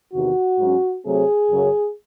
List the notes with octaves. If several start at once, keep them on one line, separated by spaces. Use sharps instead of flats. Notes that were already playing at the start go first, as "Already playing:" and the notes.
E2 C3 D#3 F#4
G#2 F#3 C#4
C3 F#3 A3 C4 G#4
F#2 C#3 F#3 C#4